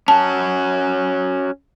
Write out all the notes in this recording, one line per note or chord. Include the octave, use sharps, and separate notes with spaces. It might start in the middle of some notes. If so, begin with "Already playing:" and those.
C#4 F#4 A5